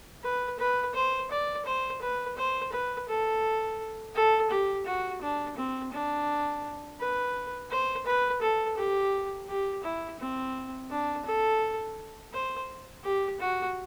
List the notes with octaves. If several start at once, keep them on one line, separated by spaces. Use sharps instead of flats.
B4
B4
C5
D5
C5
B4
C5
B4
A4
A4
G4
F#4
D4
C4
D4
B4
C5
B4
A4
G4
G4
E4
C4
D4
A4
C5
G4
F#4